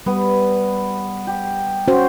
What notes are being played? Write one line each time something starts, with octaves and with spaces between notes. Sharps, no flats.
G3 B3
G4
C#4 F#4 C5